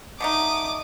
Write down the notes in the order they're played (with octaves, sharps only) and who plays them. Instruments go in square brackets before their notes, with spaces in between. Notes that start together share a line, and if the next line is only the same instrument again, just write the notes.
[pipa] D3 A3 D#4 [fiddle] D6 D#6